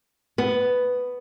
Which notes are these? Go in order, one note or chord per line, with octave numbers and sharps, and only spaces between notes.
B3